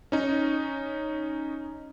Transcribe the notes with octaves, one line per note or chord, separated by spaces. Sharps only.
C#4 D#4